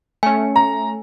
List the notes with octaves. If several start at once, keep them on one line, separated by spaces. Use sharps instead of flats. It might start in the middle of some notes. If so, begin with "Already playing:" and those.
A3 C#4 G#5
A#5